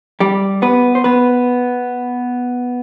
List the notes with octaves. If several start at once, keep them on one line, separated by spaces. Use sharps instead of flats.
G3 G4
B3 B4
C5
B3 B4